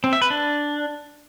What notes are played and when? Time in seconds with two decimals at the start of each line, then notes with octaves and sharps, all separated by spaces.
0.04 C4
0.13 E5
0.22 B4
0.30 D4